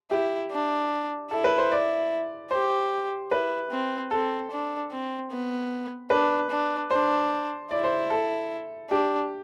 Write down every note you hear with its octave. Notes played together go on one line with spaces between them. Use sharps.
E4 G4
D4
E4 A4
B4
C5
D5
G4 C5
E4 B4
C4
C4 A4
D4
C4
B3
D4 B4
D4
D4 C5
E4 D5
C5
A4
D4 G4